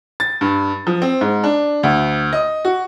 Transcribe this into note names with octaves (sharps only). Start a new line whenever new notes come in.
A6
G2
F3
C4
G#2
D4
D2
D#5
F#4